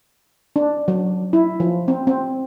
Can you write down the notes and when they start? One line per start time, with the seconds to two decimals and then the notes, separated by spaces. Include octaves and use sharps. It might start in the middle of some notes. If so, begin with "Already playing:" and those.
0.56 D4
0.88 F#3
1.33 E4
1.60 F3
1.88 C4
2.07 C4